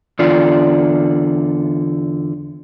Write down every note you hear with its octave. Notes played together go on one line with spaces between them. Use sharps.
E2 D3 F4 D5